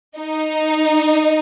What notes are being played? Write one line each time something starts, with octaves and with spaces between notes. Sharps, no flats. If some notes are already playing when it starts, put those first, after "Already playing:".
D#4